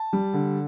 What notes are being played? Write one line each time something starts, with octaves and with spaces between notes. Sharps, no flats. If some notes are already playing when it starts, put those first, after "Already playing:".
Already playing: A5
G3
D3